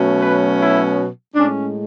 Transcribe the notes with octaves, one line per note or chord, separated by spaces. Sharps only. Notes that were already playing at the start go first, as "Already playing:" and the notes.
Already playing: B2 F#3 A3 C#4
B4
E4
A2 G#3 C#4 D4